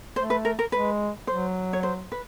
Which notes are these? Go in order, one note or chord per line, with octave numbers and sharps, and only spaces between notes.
A3 C5
B4
A#4
A#4
G#3 B4
F#3 C5
C#5
C5
B4